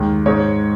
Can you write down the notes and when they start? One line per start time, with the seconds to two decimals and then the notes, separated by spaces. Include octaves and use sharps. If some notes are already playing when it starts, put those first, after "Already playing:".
Already playing: D#2 D#3 G#3
0.26 G#2 G#3 C#5